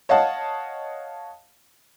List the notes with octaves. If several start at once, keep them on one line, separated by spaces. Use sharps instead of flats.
C#5 D#5 F5 F#5 A5